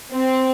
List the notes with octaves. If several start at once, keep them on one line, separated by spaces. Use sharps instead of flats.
C4